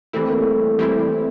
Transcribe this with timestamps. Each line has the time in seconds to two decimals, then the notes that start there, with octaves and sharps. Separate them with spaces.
0.13 E3 G3 A3 C4 E4
0.28 A#3
0.40 A3
0.79 E3 G3 C4 E4